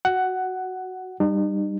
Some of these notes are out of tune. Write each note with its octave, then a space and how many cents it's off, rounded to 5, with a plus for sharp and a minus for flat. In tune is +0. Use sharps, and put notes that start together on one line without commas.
F#4 +0 F#5 +10
G3 +0 D#4 -40